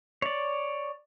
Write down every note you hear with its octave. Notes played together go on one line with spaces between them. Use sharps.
C#5 D5